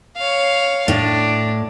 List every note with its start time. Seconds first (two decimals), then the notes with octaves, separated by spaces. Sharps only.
0.17 C#5 F5
0.88 A2 D4